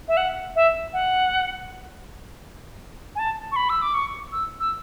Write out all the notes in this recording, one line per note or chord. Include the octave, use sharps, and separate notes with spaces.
E5
F#5
E5
F#5
G#5
A5
C#6
B5
E6
D6
C#6
E6
E6